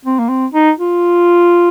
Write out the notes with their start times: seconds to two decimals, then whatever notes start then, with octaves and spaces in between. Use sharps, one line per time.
0.05 C4
0.19 A#3
0.29 C4
0.54 D#4
0.79 F4